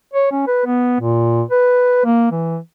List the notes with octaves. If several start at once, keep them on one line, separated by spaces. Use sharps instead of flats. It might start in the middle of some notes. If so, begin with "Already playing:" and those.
C#5
C#4
B4
B3
A#2
B4
A#3
E3